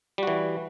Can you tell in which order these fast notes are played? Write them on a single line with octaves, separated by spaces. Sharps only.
G3 F#4 E3